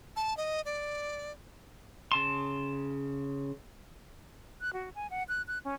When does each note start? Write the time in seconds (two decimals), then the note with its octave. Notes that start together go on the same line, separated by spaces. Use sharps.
0.16 A5
0.37 D#5
0.65 D5
2.12 C#3 A5 C6
4.60 F#6
4.73 F#4
4.95 G#5
5.10 F#5
5.28 F#6
5.47 F#6
5.64 C#4